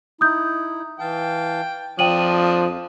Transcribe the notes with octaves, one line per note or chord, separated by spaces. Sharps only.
D#4 E4 D#6 G6
E3 F5 G5 A5
F2 F3 D4 G5 D#6 D#7 F#7